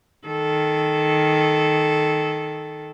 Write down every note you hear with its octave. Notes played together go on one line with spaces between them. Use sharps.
D#3 A4